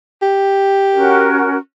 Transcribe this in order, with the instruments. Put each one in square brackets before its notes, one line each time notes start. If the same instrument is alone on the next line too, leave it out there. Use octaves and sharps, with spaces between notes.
[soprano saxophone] G4
[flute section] C#4 F#4 A#4